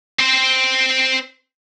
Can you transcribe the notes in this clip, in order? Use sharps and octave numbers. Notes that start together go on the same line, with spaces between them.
C4 C5